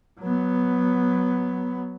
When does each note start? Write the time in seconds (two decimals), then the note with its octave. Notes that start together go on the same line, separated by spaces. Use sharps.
0.20 F#3 B3